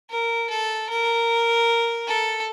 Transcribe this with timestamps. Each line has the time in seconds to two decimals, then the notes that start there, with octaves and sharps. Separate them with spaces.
0.10 A#4
0.50 A4
0.89 A#4
2.07 A4